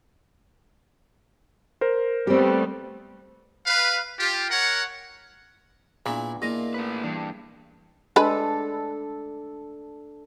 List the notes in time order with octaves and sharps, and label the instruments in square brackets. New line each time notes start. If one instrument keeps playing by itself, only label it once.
[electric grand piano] A#4 C5
[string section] G3 A3 B3 [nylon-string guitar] C4 G4
[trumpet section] B4 F5
F4 G4
A#4 C#5 F#5
[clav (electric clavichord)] A#2 [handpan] B3 D4 [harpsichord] E4 G#4 B4
[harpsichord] A#2 F4 [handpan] A#3 E4 G#4 [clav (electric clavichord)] D#5
[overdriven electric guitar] A3 B4
[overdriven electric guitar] G2 D4 [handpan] E3
[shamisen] G#3 B4 B5 [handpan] D4 A4